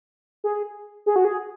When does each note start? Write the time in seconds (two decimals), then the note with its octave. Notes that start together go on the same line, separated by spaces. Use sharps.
0.44 G#4
1.06 G#4
1.16 F#4
1.25 G#4